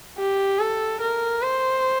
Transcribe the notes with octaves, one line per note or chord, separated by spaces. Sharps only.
G4
A4
A#4
C5